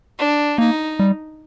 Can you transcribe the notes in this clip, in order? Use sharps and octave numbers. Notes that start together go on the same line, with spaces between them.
D4
A#3 D#4
G3